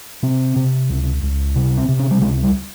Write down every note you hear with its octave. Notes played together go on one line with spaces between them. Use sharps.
C3 C4
C3
C#2
C#2
C3
C4
C3
C#4
G3
C#2 G#3
G3